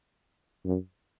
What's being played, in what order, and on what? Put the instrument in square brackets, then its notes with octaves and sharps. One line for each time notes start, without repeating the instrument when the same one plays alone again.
[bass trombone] F#2